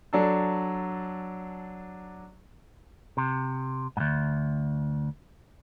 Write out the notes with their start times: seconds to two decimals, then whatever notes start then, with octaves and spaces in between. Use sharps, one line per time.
0.13 F#3 D4 A4
3.17 C3
3.97 D2 G#2